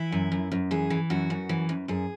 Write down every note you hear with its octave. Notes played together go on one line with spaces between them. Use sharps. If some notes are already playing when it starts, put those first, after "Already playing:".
Already playing: E3 E4
F#2
F#2
F#2
E3 G#4
E3
F#2 F#4
F#2
E3
F#2
F#2 G#4